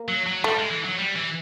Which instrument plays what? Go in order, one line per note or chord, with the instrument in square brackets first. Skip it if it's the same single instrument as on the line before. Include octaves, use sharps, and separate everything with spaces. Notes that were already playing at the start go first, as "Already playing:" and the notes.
Already playing: [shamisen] A#3
[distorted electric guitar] F#3
F#3
[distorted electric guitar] G3 [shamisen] A3
[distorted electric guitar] G#3
E3
F#3
G3
E3